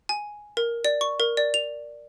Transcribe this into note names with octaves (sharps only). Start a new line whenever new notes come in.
G#5
A#4
D5
C#6
A#4
D5
F7